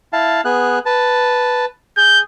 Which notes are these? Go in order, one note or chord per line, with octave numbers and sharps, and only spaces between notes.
E4 F5 A5
B3 G#4 F#6
B4 A5
G#4 G6